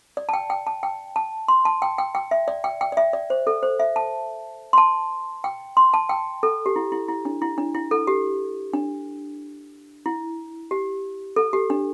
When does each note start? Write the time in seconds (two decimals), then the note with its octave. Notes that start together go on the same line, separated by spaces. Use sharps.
0.17 D5
0.29 A5
0.33 G5
0.50 G5
0.67 A5
0.83 G5
1.16 A5
1.48 C6
1.65 A5
1.82 G5
1.98 G5
2.15 G5
2.31 E5
2.48 D5
2.64 G5
2.81 G5
2.92 D5
2.97 E5
3.13 D5
3.30 C5
3.47 A4
3.63 C5
3.80 E5
3.96 A5
4.73 C6
4.78 A5
5.44 G5
5.77 C6
5.94 A5
6.09 G5
6.43 A4
6.66 G4
6.76 E4
6.92 E4
7.08 E4
7.25 D4
7.42 E4
7.58 D4
7.75 E4
7.91 A4
8.07 G4
8.73 D4
10.06 E4
10.71 G4
11.36 A4
11.53 G4
11.70 D4